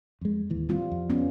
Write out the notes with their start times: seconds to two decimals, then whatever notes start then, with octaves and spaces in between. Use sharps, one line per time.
0.21 F2 G#3
0.49 D1 D#2 E3
0.69 G3 C4 F4
0.92 F2
1.10 B3 C#4